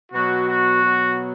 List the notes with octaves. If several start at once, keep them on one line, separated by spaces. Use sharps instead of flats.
B2 F#3 F#4
F#4
B2 F#3